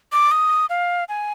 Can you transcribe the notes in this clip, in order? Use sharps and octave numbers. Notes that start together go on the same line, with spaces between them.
D6
D#6
F5
G#5